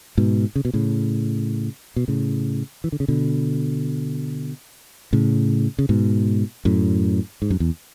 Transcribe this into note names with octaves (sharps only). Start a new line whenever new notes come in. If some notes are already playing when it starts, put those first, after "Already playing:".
G#2 B2
C#3
B2
A2 C#3
B2
A2 C#3
E3
D3
C#3
B2 D3
A2 C#3
C#3
G#2 B2
F#2 A2
G#2
F#2
E2